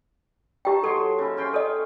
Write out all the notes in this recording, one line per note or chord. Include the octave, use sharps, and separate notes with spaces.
D#4 G4 G5 A5
F#3 A4 C#5 C6
C#3 E4
C#4 G5 C6
A4 D#5